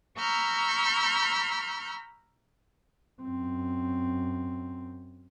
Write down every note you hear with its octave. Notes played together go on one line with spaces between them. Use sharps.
A#5 B5 C#6 E6 F6 G6
F#2 C4